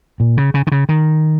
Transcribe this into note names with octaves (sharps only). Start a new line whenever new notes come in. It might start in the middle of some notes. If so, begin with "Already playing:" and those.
A#2
C#3
C#3
D#3
C#3
D#3